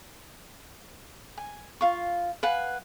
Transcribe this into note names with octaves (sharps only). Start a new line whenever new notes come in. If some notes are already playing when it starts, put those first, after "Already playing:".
G#5
F4 F5 C#6
B4 F5 F#5 G#5